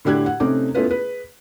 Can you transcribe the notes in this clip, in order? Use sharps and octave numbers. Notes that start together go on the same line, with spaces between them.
A2 D3 D4 G4 F#6 G#6
F#5
C3 A3 C4 C#4 D#4 D6
A3 B3 C#4 E4 F4 B4
G#4 B4